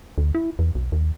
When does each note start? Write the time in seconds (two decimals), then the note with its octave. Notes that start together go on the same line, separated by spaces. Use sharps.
0.18 D2
0.35 E4
0.59 E2
0.75 B1
0.92 D#2